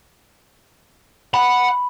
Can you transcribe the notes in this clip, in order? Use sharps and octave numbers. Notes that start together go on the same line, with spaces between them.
F#5 B5